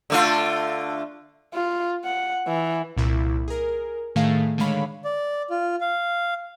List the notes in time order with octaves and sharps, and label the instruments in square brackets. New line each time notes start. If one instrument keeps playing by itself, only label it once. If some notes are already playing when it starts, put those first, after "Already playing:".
[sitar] D3 A3 F4
[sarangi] F4
F#5
E3
[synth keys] C2 A#2 E4
G#4 A#4
A2 D#3 A3 G#4 F5
D3 D#3 G#3 C#5 F5 B5
[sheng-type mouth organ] D5
F4
F5